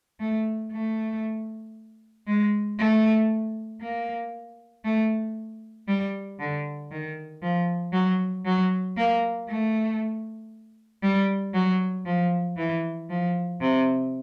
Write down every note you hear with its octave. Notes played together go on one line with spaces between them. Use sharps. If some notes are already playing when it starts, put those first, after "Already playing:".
A3
A3
G#3
A3
A#3
A3
G3
D3
D#3
F3
F#3
F#3
A#3
A3
G3
F#3
F3
E3
F3
C3